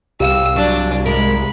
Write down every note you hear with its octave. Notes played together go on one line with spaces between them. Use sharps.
C2 G4 F5 E6
F#3 D4
G#3 A#4 B5